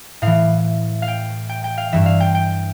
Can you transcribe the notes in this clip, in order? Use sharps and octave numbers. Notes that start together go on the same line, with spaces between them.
A2 E3 F5
F5
G5
G5
G5
F5
G2 E3 E5
F5
G5
G5